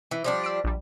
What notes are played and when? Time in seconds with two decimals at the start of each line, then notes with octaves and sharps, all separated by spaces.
0.11 E3
0.24 F3 G3 D4
0.44 E6 C7 D7
0.64 A#1 G3